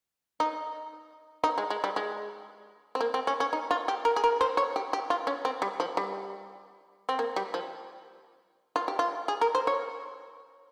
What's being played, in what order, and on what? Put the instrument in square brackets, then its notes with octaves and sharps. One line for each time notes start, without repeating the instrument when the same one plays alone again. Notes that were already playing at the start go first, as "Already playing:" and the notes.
[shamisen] D#4
D#4
G#3
G#3
G3
G#3
C4
A#3
C4
C#4
C#4
D#4
F4
G4
A#4
G#4
A#4
C5
C#5
G4
G4
F4
C#4
C4
G3
F3
G3
C4
A#3
G3
F3
F4
G4
F4
G#4
A#4
C5
C#5